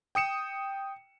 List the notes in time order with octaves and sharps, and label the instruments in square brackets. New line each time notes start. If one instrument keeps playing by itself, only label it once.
[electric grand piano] G5 D#6 C#7 E7